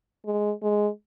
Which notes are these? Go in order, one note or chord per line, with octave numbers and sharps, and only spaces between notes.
G#3
G#3